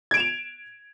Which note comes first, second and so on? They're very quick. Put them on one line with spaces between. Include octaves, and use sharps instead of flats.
G#6 D7 E7 F7